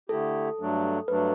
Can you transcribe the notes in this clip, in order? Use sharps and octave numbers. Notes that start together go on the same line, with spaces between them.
D3 A3 E4 G4 A4
G2 F#3 A3 D4
G2 F#3 A3 D4 B4